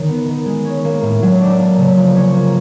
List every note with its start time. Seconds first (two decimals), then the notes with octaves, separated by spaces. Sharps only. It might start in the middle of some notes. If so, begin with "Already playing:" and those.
Already playing: D#3 C#4
0.08 B3
0.28 D#3
0.46 G#3
0.65 C#4
0.84 A#3
1.02 A2
1.22 F#3
1.40 D4
1.59 A#3
1.77 C#3
1.96 F3
2.16 C#4
2.34 A#3